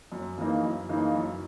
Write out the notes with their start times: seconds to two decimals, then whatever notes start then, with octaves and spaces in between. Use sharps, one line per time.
0.12 F#2
0.38 C#3 E3 A#3 D#4
0.63 F#2
0.89 C#3 E3 A#3 D#4
1.15 F#2